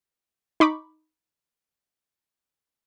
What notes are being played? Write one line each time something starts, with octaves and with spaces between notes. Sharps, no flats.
D#4 B5 C#6 D6